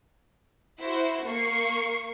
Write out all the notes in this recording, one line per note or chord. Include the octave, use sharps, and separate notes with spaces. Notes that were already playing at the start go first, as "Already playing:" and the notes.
E4 F#4 C5
A#3 C#6 C7